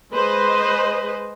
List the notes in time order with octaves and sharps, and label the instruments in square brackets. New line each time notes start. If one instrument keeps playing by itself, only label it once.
[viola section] G#3 B4 C5 D#5